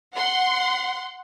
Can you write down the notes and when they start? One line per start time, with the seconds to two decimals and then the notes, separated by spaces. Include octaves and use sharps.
0.15 F#5 C6